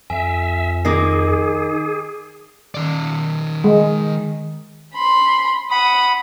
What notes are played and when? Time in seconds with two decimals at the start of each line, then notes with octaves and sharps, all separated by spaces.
0.10 F2 E5 G#5
0.85 D#3 D#4 G#4 A#4 D6 D#6 C7
2.74 D#3 D5
3.64 G#3
4.94 B5 C6
5.71 F#5 B5 D#6